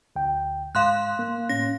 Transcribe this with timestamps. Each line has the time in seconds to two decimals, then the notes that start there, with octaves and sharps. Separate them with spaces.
0.16 D2 G5
0.75 G#2 F5 C6 F#6
1.19 A#3
1.49 A2 C#4 A#6